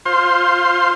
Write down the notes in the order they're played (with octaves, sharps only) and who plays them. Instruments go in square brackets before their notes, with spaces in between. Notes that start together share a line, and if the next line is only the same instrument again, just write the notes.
[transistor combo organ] F4 C5 C6